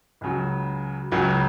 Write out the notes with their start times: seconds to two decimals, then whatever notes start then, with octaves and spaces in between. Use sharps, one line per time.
0.21 C#2 C#3 F#3
1.12 C#2 C#3 F#3